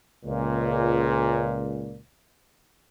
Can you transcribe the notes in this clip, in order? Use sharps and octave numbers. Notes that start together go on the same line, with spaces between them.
C#2 A#2